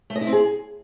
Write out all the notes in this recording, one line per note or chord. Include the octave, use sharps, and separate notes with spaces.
A3
D#5
E4
C4
G#4